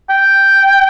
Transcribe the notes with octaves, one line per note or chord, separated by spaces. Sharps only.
G5